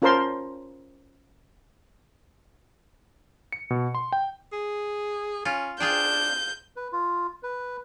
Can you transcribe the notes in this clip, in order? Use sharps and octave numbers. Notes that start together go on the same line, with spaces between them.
C#4 F4 A#4 C5 A5 C6
C#7
B2
C6
G5
G#4
C#4 F4
D4 F4 G#4 G5 G6
B4
F4
B4